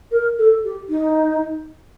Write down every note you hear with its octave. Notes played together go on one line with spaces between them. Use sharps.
A#4
A4
G4
D#4